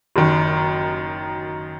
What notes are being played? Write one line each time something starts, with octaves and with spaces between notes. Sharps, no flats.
F#1 F#2 D#3